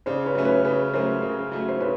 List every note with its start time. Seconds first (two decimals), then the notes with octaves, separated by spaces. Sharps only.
0.06 C#3 C5 D5
0.26 B4 C#5
0.35 F#3 A3 C#4
0.45 B4 C#5
0.64 C#3 B4 C#5
0.93 F#3 A3 C#4 A#4 C5
1.22 C#3
1.52 F#3 A3 C#4
1.69 C5
1.80 C#3 B4 C#5